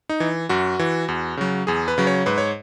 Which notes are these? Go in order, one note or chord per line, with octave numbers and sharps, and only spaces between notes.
D#4
E3
F#2 F#4
E3
E2
C#3 F#3
E2 G#4
B4
C#3 F#3
C#5
G#2 B4
C#5